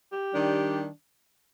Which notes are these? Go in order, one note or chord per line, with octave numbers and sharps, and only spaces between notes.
G4
D#3 G3 D4